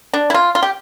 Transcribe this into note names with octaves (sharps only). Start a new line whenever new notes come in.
D4
E4
F4
F4
G4